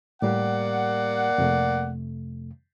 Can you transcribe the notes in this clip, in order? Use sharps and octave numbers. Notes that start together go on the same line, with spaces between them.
A2 G3 A#3 G4 D5 F#5
F2 C3 A3